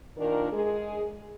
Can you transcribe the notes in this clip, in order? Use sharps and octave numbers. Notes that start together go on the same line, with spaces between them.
A#2 D#3 D4 A#4
G#3 G#4